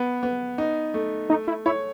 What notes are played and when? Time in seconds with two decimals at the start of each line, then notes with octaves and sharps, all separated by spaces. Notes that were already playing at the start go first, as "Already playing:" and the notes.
Already playing: B3
0.23 B3
0.58 D#4
0.94 A3
1.30 A3 D#4
1.48 E4
1.66 E4 C#5